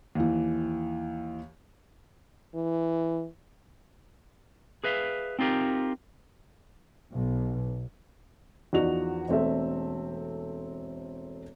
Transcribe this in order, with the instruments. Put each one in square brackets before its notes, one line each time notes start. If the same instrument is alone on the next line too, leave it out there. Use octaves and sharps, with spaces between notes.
[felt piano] D#2 E3
[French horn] E3
[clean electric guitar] G#4 B4 E5 F5
C4 D#4 F4 G4 A#4
[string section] B1
[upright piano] E2 F3 D#4 F#4 D5 F7
E1 A3 C4 A4 E5